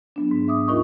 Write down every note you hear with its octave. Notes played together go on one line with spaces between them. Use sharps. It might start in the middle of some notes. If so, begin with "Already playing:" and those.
F#3 B3 D4
G#2
E5 D6 D#6
D#2 D#4 F4 A#4 D#5 C#6